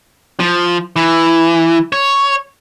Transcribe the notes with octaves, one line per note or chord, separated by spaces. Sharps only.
F3
E3
C#5